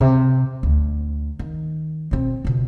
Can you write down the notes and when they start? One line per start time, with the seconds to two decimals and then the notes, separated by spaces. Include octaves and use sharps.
0.01 C3
0.63 D2
1.39 D#3
2.11 B2 C4
2.45 C#2 B2